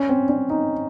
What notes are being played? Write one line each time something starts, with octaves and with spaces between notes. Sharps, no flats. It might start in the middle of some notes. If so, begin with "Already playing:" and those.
Already playing: C#4
C4
C#4
D#4